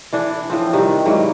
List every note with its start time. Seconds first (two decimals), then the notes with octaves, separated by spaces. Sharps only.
0.13 E3 D4 A4
0.50 A2 F3 C4
0.73 C3 D#3 G3 D#4
1.06 G#2 E3 F#3 A#3